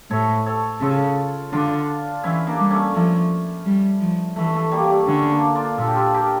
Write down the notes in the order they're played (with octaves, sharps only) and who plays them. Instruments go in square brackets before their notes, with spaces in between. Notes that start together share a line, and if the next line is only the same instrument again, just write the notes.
[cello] A2 [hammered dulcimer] A4 C#5
[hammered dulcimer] A4 C#5
[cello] C#3 [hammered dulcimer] F4 A4
[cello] D3 [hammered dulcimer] D4 F4
[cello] E3 [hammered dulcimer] C#4 E4
[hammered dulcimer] A#3 D4
[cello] G3
[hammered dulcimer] A3 C#4
[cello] F3 [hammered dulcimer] A3
[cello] G3
F3
[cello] E3 [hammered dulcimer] A3
[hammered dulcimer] A3
G3 A#3
G3
A3
[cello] D3 [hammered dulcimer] A3 C#4
[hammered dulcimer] A#3 D4
D4 F4
[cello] A#2 [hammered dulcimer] F4 A4
[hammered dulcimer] G4
F4 A4
G4 A#4